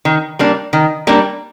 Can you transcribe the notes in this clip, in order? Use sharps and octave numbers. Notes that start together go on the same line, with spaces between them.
D#3
G3 A#3 D4
D#3
G3 A#3 D4